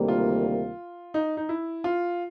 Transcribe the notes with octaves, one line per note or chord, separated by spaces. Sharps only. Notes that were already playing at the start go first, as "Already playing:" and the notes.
Already playing: D2 C3 D#3 G3 A#3
F4
D#4
D#4
E4
F4